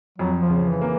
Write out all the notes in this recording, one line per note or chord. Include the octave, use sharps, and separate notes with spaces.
F2 F#3
F3
C#3
E3
A#3